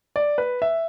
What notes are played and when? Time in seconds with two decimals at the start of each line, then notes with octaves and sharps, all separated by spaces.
0.16 D5
0.38 B4
0.62 E5